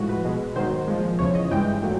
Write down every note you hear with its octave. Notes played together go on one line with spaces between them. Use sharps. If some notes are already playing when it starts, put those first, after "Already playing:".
Already playing: A2 F3 G#3 F#4
B4
B2 G#3
G#2 D#3 F#3 C5
A#2 F3 G#3
E2 C#3 F3 C#5
D#5
G2 E3 G#3 G5
A#2 F#3 A3